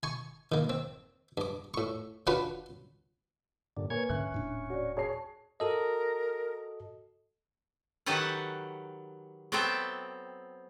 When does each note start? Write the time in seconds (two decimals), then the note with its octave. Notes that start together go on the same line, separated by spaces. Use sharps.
0.03 G#5 C#6
0.52 D#3 A#3
0.70 C4
1.38 G2 D6
1.74 A2 C#6
2.27 C#4 D4 F4 F#4 B4 B5
3.77 G2 A#2 D3
3.90 A#3 B4 C#5 G#5 G#6
4.10 C2 G#2 D3 C#4 E5 G#5 F#6
4.32 D#1 A2 D4
4.70 F#4 C#5 D5
4.97 G#4 C#5 A5 C7
5.60 F#4 A4 A#4 D#5
8.06 D#3 F#3 G4 A4 B4 F#5
9.52 F#3 B3 C4 A4 E5 G5